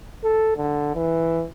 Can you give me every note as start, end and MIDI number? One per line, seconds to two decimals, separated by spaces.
0.24 0.53 69
0.57 0.93 50
0.95 1.44 52